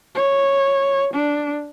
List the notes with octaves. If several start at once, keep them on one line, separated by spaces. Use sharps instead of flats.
C#5
D4